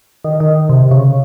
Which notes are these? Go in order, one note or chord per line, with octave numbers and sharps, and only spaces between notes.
D#3
D#3
C3
C#3